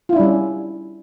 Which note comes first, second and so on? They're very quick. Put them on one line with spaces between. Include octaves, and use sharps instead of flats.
F4 E4 D4 G3 C#4